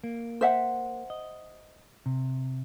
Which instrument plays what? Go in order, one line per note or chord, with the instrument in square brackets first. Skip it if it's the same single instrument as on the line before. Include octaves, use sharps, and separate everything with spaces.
[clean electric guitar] A#3
[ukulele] C5 E5 F#5
[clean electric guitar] D#5
C3